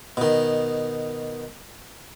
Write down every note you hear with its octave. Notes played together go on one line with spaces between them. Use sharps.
B2 D#3